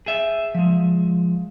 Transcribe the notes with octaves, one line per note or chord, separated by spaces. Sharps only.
G#4 E5
F3 G#3